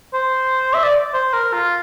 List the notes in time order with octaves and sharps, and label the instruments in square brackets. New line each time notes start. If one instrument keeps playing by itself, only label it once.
[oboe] C5
E5
D5
C5
A#4
F4